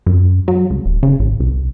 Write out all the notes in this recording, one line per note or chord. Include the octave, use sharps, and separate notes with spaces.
F#2
F#3
C#2
D#1
C#3
A1
C2